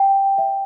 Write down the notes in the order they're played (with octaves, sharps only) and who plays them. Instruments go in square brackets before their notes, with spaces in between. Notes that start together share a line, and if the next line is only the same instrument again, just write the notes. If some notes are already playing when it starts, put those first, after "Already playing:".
Already playing: [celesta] G5
E5